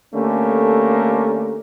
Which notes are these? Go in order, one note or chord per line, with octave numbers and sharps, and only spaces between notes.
D3 A3 A#3 C#4 G4